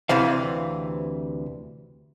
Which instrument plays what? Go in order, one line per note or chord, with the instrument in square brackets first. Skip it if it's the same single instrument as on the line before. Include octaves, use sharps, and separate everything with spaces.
[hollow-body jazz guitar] D2 C3 E3 F5